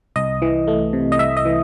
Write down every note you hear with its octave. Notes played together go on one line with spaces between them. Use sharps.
C2 D#5
E3
A3
C3
D#5
C2 E5
D#5
E3